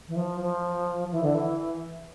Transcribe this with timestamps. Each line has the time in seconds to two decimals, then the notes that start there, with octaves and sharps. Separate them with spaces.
0.08 E3
0.16 F3
0.41 F3
1.11 E3
1.23 D3
1.35 E3